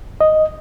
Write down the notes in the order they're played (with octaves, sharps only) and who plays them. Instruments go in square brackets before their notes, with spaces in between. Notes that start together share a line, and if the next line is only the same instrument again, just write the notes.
[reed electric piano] D#5